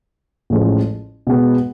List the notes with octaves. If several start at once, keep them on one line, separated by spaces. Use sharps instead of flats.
A1 A2 F3 G#3 C#4
B2 G#3 B3